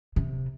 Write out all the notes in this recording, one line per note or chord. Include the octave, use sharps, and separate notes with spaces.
C3